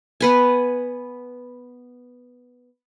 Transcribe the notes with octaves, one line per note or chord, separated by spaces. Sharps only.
B3 B4 G#5